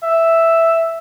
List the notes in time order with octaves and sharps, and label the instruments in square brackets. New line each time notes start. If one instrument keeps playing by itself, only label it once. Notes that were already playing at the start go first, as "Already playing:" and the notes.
[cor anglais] E5